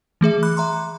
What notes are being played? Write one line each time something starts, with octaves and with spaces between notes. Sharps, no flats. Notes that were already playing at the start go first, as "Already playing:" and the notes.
E3 A3 G#4 E5
B5 D6 F#6
E5 A#5 C6